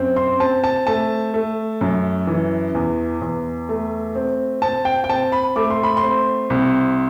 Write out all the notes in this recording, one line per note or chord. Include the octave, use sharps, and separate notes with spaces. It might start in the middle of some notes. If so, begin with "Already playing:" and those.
Already playing: F#2 C4
C6
C4 A5
A5
A3 A5
A3
F#2
E3
E2
E2
A3
C4
C4 A5
G5
G5
C4 A5
B5
A3 D6
C6
B5
C6
C4
C2